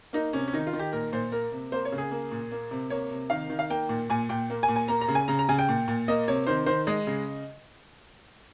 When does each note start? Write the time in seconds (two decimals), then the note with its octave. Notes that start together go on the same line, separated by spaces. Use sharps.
0.13 A#3 D#4
0.33 C3 C#4
0.48 C#4
0.53 D#3 D#4
0.67 F4
0.73 D#3
0.79 G4
0.93 A#2 A#4
1.13 A#2 C5
1.32 A#3 A#4
1.52 C3
1.72 A#3 C5
1.85 C#5
1.92 C#3
1.98 G#4
2.11 A#3
2.32 A#2
2.52 A#3
2.71 C3
2.90 A#3 C#5
3.11 C3
3.30 D#3 F5
3.50 D#3
3.59 F5
3.70 A#3 G5
3.89 A#2
4.10 A#2 G#5
4.29 A#2 G5
4.50 A#3
4.63 G#5
4.68 A#2
4.76 G#5
4.88 A#3 A#5
5.01 A#5
5.08 C#3
5.15 G#5
5.28 C#3 A#5
5.39 A#5
5.49 C#3 G#5
5.59 G5
5.69 A#2
5.88 A#2
6.08 A#3 D#5
6.28 C3 C#5
6.47 D#3 C5
6.66 D#3 C5
6.87 G#3 D#5
7.07 C#3